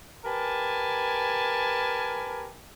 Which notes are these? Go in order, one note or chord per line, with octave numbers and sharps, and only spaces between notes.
G4 A#4 B4 G#5 A5